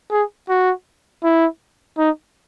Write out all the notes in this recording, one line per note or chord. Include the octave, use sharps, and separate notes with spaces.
G#4
F#4
E4
D#4